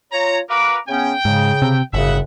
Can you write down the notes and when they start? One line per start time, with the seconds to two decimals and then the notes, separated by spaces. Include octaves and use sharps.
0.11 F4 C#5 A#5
0.49 F#4 A#4 B4 F5 A#5 D6
0.88 C#3 B3 C#4 G5
1.25 G#2 C#3
1.62 C3
1.93 G1 F#2 A2 C#3 E5 F#5